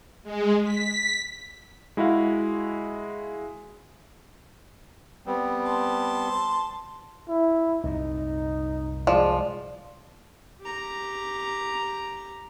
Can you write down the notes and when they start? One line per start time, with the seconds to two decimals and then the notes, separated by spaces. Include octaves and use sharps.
0.23 G#3
0.63 B6
1.97 G#3 E4 F#4 G#4 F5
5.26 G3 B3 C4
5.65 A5 C6
7.28 E4
7.84 C2 F#2 A#2 D#4
9.07 F3 G#3 D5
10.61 G4 A#5